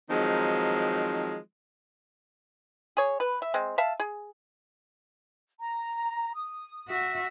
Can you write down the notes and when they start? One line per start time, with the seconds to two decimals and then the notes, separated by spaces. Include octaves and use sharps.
0.10 D#3 F3 F#3 G#3 C4 D#4
2.97 G#4 C#5
3.20 B4
3.42 E5
3.54 G#3 C4
3.78 E5 F5 A5
4.00 G#4
5.60 A#5
6.35 D#6
6.88 F#4 E5